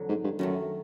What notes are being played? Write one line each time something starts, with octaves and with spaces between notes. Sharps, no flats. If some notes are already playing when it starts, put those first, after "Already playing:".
Already playing: F2 D3 F#3
G#2
G2
F#2 D#3 F#3 A3